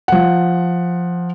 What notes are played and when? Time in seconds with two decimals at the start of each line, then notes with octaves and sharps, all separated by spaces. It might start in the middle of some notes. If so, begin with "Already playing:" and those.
0.08 F3 F#5